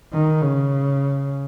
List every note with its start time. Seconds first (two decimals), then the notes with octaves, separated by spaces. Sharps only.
0.13 D#3
0.42 C#3